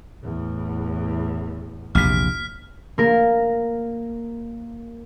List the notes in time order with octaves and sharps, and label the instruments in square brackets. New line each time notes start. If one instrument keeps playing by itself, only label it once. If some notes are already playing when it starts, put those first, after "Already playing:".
[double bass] E2 A2
[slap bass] A#1 E2 C3 [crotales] F6 B6
[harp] A#3 A#4